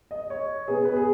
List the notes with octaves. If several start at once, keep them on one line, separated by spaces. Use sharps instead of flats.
D#5
C#5
B2 B3 G#4
B4
G#4